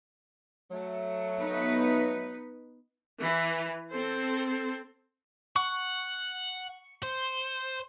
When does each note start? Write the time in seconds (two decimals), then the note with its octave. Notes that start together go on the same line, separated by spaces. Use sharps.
0.71 F#3 A3
1.39 B3 D#4 B4
3.22 E3
3.92 C4 A4 C5
5.56 F#5 C#6
7.03 C5